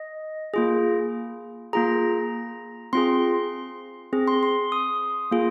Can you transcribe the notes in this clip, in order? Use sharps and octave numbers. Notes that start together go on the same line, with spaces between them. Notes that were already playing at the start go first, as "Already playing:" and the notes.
Already playing: D#5
A#3 F4 G#4
A#3 F4 G#4 A#5
C4 F4 G#4 C6
C4 G#4
C6
C6
D#6
A#3 F4 G#4